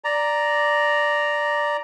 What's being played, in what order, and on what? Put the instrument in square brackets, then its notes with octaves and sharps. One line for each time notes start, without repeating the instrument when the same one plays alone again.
[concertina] D5 A#5